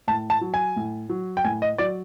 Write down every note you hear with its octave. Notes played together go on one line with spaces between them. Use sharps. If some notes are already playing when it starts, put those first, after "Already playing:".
A2 A5
A5
F#3
G#5
A2
F#3
G5
A2 G#5
D#5
F#3 D5